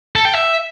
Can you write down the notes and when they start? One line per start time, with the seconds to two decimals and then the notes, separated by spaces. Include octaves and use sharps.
0.16 A4
0.25 G5
0.35 E5